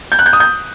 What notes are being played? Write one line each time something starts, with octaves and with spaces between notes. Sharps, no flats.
G6
F#6
G6
D#6
G6